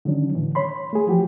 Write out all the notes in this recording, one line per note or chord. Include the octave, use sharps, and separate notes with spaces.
D3 D#3 F#3 C#4 D4
A2 D3 E3
C#5 B5 C6
A3 G#4
E3 F3 F#4 G4